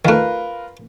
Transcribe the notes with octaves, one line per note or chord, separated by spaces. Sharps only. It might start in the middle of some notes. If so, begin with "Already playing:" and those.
D#3 A3 F4 A#4 B4